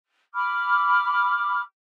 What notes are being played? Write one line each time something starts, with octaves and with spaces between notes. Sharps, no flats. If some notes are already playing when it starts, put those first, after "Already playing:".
B5 D6 F6